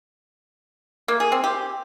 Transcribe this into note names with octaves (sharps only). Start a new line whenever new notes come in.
A#3
G#4
C4
G4